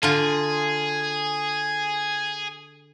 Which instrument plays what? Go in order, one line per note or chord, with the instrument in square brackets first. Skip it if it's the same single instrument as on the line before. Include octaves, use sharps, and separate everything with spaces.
[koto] D3 F4 [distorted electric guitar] G#4